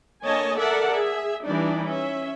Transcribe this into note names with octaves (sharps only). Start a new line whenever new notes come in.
D3 A#3 C#5 D#5 G#5 A5
A4 A#4 D5 E5 F#5 A5
G#4 E5
E3 G3 D4 D#4 D5
C#4 E5